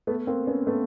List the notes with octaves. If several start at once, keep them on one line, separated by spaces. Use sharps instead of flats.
A3 B3
A#3 C4
B3 C#4
A3 B3